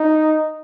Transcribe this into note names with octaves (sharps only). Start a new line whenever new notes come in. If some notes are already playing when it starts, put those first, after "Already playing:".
Already playing: D#4